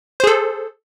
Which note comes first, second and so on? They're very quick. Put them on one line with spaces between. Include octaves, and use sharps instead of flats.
C5 G#4 A4